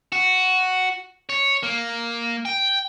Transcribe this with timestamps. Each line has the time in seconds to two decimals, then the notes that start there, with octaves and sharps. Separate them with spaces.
0.12 F#4
1.29 C#5
1.63 A#3
2.45 G5